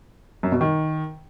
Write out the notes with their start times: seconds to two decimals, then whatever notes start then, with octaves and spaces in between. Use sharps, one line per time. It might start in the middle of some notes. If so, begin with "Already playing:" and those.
0.43 F#2
0.52 B2
0.61 D#3